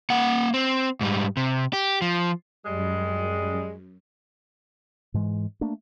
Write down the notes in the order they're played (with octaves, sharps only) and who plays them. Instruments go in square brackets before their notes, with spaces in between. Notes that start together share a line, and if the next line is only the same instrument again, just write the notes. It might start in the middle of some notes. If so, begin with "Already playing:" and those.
[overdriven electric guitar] A#3 F#5
C4
G#2 G3
C3
G4
F3
[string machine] F#2 [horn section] G3 G#3
[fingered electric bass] G#2 E3 G#3
A3 A#3 D4